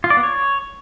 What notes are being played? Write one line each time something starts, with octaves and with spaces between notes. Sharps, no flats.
F4
D5
B3
C#5